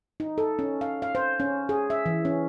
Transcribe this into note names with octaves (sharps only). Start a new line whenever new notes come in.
D#4
A4
C#4
F5
F5
C5
C#4
G#4
E5
E3
C#4